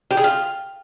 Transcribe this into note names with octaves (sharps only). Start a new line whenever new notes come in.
G4
G#4
F4